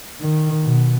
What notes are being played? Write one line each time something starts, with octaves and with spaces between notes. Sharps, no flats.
D#3
B2